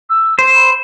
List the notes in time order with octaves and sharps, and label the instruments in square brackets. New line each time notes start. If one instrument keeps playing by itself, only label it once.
[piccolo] E6
[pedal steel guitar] C5 [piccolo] C7
[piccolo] B5